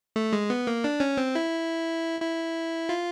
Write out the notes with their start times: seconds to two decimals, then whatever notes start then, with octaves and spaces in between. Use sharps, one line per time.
0.16 A3
0.33 G#3
0.50 B3
0.67 A#3
0.84 D4
1.00 C#4
1.17 C4
1.35 E4
2.21 E4
2.89 F4